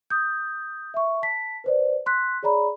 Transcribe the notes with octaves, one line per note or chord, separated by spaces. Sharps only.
D#6 G6
E5 C#6
A5 B6
B4 C5 D5
C6 F#6 B6
G#4 C#5 D5 A#5 B5